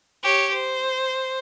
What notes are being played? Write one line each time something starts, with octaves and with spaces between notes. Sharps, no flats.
G4 C#5
C5